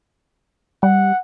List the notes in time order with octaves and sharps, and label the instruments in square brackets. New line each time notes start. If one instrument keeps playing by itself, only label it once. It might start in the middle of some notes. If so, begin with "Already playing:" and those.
[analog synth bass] G3 [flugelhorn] F#5